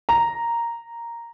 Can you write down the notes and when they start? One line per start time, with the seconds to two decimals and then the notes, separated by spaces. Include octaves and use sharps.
0.09 A#5